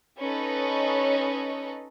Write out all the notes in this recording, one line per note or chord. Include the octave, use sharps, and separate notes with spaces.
C#4 D#4 A4 B4 C#5 D#5